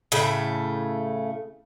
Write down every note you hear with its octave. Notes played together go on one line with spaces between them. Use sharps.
A2 C#3 A3